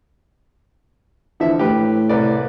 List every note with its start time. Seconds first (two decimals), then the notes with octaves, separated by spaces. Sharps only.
1.40 D3 E3 F3 E5
1.59 A2 G4 B4
2.09 C2 B4 D5